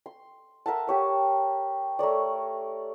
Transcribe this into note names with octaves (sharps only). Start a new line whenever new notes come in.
C6
A#4 E5 F#5 A5
G4 C#5 D#6
A3 A#4 C#5 D5